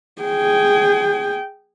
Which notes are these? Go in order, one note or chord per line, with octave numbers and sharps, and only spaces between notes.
G#4 G5